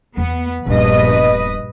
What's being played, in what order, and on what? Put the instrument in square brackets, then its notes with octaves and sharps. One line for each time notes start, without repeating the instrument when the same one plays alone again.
[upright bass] E2 E3 [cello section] B3
[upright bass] D#1 B3 [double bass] A#1 G2 [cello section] B4 D#5